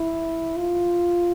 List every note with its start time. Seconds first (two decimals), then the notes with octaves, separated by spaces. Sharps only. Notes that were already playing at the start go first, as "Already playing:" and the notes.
Already playing: E4
0.57 F4